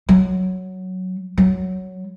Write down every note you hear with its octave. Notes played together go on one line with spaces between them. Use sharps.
F#3
F#3